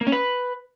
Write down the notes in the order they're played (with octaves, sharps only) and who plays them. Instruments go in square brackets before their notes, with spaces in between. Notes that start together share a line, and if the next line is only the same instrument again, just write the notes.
[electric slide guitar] A#3
C#4
B4